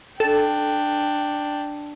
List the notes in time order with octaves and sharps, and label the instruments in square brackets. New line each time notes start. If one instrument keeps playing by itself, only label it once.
[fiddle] D4 G5 [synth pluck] A4